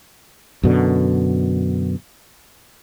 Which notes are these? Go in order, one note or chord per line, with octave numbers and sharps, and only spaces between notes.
F#2 B2 D3